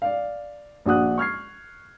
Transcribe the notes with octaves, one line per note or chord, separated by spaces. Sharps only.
D5 F5
A#1 D4 F#4 F#5 D#6 F#6
C#6 F6 G#6 C7